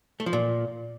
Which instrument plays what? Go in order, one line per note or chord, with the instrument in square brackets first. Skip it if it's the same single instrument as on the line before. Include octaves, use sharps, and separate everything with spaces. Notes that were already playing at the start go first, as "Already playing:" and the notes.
[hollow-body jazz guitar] A3
F3
A#2